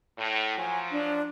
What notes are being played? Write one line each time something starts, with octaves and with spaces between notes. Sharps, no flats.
A2
F3 F#3 G#5
D4